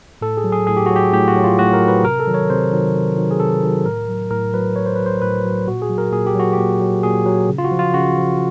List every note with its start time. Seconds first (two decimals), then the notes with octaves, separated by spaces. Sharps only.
0.21 A2 A4
0.37 G#4
0.44 F#3
0.52 G#4
0.67 A2 G#4
0.77 G4
0.86 F#3 F#4
0.96 G4
1.13 A2 G4
1.28 F#4
1.36 F#3
1.44 F4
1.59 A2 F#4
1.73 A#4
1.81 F#3
1.88 B4
2.04 C3 A#4
2.20 A4
2.27 D#3 F#3
2.34 C#5
2.50 C3 C5
2.73 D#3 F#3
2.94 C3
3.17 D#3 F#3
3.31 G#4
3.40 C3 A4
3.63 D#3 F#3
3.85 A2 A#4
4.09 F#3
4.31 A2 A#4
4.54 F#3 B4
4.76 A2 C#5
4.86 C5
4.96 F#3 B4
5.06 C5
5.22 A2 B4
5.45 F#3
5.67 A#2 F#4
5.82 G#4
5.90 F#3
5.98 A#4
6.12 A#2 G#4
6.27 G4
6.35 F#3 F#4
6.53 A#2 G4
6.81 F#3
7.03 A#2 G#4
7.26 F#3
7.49 C#3
7.58 F4
7.65 F#4
7.72 F3
7.79 F4
7.94 C#3 F#4
8.18 F3